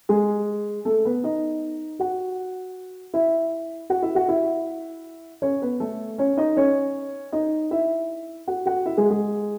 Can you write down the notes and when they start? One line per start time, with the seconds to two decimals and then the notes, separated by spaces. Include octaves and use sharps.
0.09 G#3 G#4
0.85 A3 A4
1.05 B3 B4
1.24 D#4 D#5
1.99 F#4 F#5
3.14 E4 E5
3.90 F#4 F#5
4.02 E4 E5
4.15 F#4 F#5
4.28 E4 E5
5.42 C#4 C#5
5.62 B3 B4
5.80 A3 A4
6.18 C#4 C#5
6.37 D#4 D#5
6.56 C#4 C#5
7.33 D#4 D#5
7.71 E4 E5
8.47 F#4 F#5
8.66 F#4 F#5
8.86 E4 E5
8.97 G#3 G#4
9.10 G#3 G#4